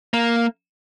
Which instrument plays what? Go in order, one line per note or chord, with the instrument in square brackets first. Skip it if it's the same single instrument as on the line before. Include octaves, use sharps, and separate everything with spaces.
[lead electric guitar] A#3